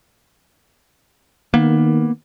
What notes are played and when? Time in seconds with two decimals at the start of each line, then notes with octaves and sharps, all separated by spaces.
1.54 D#3 A#3 B3